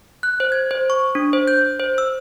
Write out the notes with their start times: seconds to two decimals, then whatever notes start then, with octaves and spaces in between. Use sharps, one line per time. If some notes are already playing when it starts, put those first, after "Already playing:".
0.23 F#6
0.40 C5
0.52 G#6
0.71 C5
0.90 C#6
1.15 D4
1.33 C5
1.47 G6
1.80 C5
1.98 E6